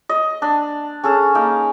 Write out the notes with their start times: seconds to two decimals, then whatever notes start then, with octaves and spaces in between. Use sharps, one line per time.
0.09 D#5
0.42 D4
1.04 C#4 G#4 A4
1.35 A#3 D#4